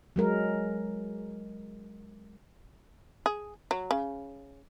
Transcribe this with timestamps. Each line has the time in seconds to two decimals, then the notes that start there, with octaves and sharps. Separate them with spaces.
0.16 F#3 G#3 A#4
3.26 G#4
3.71 F#3
3.91 C#3